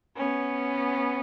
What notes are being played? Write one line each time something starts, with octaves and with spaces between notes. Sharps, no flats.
B3 C#4